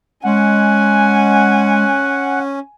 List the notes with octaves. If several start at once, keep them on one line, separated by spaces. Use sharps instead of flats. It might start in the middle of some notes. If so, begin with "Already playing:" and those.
G#3 C#4 F#5 G#5